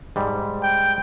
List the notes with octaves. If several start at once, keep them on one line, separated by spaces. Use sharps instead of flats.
G#2 G3
G5